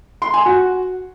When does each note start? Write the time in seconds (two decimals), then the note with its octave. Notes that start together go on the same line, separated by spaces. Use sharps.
0.22 C6
0.34 G#5
0.46 F#4